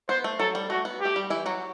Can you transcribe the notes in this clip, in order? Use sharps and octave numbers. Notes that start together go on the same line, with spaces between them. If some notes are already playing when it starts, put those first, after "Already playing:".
B3 C5
A3
F#3 A4
G3
A3 F#4
B3
A3 G4
G3
E3 E4
F#3 F#4